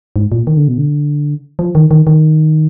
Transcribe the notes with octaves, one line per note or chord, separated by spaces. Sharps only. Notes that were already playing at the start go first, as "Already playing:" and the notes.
G#2
A#2
D#3
D3
B2
D3
F3
D#3
D#3
D#3